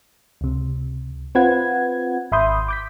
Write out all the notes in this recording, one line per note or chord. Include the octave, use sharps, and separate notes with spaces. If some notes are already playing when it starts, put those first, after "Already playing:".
C#2 C3
C4 F4 B4 F#5 G#6
G#1 E5 B5 C6 D#6 G6
D6 G6 B6